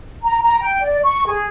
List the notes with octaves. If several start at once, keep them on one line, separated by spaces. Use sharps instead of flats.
A#5
A#5
G5
D5
C#6
G#4